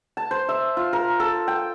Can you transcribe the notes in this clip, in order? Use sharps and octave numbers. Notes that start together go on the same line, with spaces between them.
A5
C5
E5
F4
A#4
A4
G5